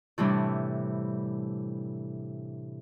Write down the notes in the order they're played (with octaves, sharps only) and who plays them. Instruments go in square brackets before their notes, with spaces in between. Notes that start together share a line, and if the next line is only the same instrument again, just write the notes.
[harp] A2 C3 E3 G3 D4